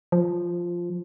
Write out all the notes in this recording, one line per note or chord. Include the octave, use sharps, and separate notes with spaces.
F3